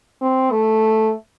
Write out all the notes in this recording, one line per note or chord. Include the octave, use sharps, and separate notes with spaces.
C4
A3